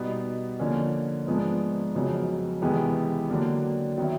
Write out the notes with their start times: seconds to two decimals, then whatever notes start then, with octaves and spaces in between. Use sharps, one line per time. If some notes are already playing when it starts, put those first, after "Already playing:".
Already playing: B2 G3 B3 D#4
0.59 D3 F3 A#3 C#4
1.27 G#2 F3 G#3 B3 D4
1.94 F2 C#3 F#3 B3 D#4
2.62 E2 C3 D#3 G#3 B3
3.30 D3 F#3 A#3 D4
3.98 D#3 F#3 B3 E4